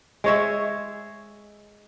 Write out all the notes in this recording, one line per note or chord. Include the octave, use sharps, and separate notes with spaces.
G#3 C#5 E5